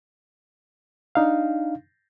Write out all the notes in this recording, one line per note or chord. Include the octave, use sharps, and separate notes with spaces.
D4 D#4 F5